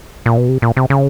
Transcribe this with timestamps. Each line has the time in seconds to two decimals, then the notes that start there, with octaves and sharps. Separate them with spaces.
0.26 A#2
0.38 B2
0.49 C3
0.62 A#2
0.77 C3
0.90 C#3